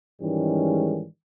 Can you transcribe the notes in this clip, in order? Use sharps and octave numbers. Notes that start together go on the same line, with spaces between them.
G#2 D#3 E3 G3 G#3 C#4